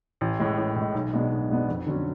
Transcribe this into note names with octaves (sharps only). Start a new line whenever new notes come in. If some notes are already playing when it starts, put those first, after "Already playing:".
A1
A2 G#3
A1
A2 G#3
B1
B2 G#3 B3 D4
B1
B2 G#3 B3 D4
F2
D3 F#3 C#4